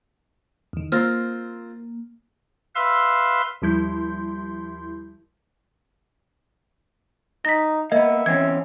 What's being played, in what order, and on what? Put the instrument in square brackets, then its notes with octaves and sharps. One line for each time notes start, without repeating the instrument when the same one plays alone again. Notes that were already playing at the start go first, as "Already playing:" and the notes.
[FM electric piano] E2 D#3
[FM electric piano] A#3 [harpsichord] C4 F4 A#4
[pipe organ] B4 E5 F5 C6 E6
[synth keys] D#2 F3 G3 E4 C6 G6
[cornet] D#4 [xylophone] A#6 B6
[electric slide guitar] A#3 B3 [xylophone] D#5 [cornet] E5
[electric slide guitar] E2 C4 C#4 [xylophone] G#6